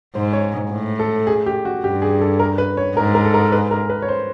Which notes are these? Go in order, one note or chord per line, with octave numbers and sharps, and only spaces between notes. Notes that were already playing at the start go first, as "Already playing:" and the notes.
G#2 C5
C#5
A2
A4
G#4
G4
F#4
G2 G4
G#4
A4
A#4
B4
C#5
G#2 A#4
A#4
A4
A#4
B4
A#4
B4
C#5
C5